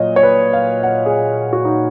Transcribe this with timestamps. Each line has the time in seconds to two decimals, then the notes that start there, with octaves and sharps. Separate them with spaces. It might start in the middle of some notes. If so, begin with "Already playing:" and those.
Already playing: A#2 F#3 C#5 D#5
0.16 C#5
0.23 B4
0.53 F5
0.83 F#5
1.06 G#4
1.53 F#4
1.65 D#4